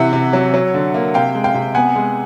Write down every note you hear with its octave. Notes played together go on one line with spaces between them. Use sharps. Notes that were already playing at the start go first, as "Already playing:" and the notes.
Already playing: C3 E3 E5 F#5
C3
F#3
F#3
D3
A#3
C3 F5 G5
G#3
F5 G5
C3
B3 F#5 G#5
G#3